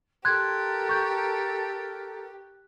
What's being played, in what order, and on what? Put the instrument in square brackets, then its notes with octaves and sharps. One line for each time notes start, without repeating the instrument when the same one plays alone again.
[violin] G4 [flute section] A4 A#4 [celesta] C6 G#6 [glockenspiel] F#6
[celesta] C#6 G6